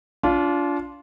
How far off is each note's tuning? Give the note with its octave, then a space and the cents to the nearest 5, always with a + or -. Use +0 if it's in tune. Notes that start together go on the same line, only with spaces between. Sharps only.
D4 -30 F4 +0